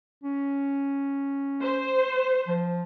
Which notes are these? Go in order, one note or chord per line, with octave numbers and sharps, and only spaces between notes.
C#4
C5
F3